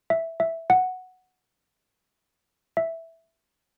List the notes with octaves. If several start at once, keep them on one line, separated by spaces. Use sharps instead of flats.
E5
E5
F#5
E5